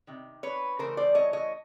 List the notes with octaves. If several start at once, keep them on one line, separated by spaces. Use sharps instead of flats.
C3 D#3
B4 C#5
C#3 E3 A3 A#4 C5
C5 D5
C#5 D#5
C#5 D#5